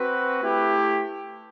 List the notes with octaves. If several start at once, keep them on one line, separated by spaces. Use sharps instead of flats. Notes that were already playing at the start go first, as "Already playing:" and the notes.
Already playing: C4 F#4 B4
A3 E4 G4